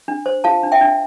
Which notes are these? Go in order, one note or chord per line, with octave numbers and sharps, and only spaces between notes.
D4
C5
F4 F5 A5
D4
E5 G5
D4